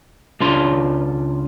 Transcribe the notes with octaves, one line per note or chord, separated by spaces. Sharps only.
C#2 D4 F4 C6